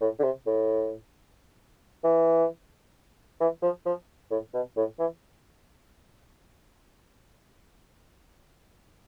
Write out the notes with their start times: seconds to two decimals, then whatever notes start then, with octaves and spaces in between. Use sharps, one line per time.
0.01 A2
0.19 D3
0.23 C3
0.47 A2
2.04 E3
3.41 E3
3.63 F3
3.86 F3
4.31 A2
4.54 B2
4.77 A2
4.99 E3